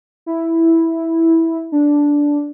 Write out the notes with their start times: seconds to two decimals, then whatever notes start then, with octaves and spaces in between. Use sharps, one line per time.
0.26 E4
1.72 D4